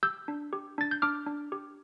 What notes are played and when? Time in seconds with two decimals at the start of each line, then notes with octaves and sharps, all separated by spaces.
0.03 G4 E6 G6
0.28 D4
0.53 G4
0.78 D4 A6
0.91 G6
1.02 D4 D6 F6
1.27 D4
1.52 G4